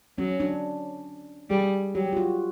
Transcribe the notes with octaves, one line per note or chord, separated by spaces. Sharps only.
F#3 C#4
D4
G3 G#4
F#3 G4
F4
F#4